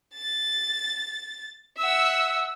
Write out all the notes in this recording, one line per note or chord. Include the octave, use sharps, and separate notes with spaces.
A6
E5 F#5 E6